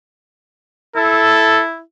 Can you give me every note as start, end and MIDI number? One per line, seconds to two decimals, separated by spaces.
0.96 1.81 64
0.96 1.62 69